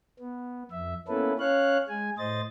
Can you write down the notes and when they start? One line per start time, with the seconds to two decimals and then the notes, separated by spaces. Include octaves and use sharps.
0.20 B3
0.71 F2 E5
1.08 A#3 B3 C#4 E4 A4 B4
1.39 C#4 C#5 F5 F#6
1.89 G#3 G#5
2.18 A2 C5 D#5 A6